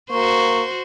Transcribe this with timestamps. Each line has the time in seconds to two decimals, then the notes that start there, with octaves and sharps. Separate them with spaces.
0.10 A#3 F#4 C5 C#6